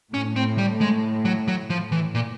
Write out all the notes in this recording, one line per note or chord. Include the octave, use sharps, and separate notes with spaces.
A2 C#4
C4
G3
G#3
F#3
F#3
F3
E3
A#2